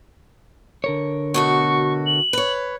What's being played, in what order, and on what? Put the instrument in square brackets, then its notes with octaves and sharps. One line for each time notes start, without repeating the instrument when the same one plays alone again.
[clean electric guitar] D3 A#4 C#5
[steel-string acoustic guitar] B2 A3 F#4 [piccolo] C#6
[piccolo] F#7
[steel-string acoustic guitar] B4 C#5